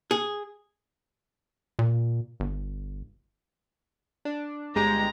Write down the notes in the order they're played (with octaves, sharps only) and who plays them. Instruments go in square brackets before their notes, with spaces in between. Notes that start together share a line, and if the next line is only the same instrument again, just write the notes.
[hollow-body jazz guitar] G#4
[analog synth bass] A#2
G1
[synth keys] D4
[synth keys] G1 G#3 G4 [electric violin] A#5